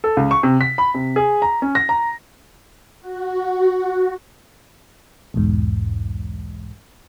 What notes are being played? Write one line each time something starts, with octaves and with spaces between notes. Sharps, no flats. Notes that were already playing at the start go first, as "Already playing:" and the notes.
A4
C#2
C#6
C3
B6
B5
C3
G#4
A#5
C#4
A#6
A#5
F#4
B1 E2 G#2